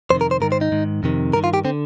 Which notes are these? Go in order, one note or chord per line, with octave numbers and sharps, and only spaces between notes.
F2 C3 D#3 C5
A#4
C5
G#2 D#3 A#4
C5
D#4
G#2 D#3
F2 C3 D#3
G2 D#3 A#4
F4
G4
D3 C4